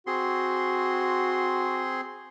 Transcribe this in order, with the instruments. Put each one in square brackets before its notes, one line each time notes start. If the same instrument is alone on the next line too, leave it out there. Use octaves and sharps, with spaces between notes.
[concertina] C4 G#4 C6 [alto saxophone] F#4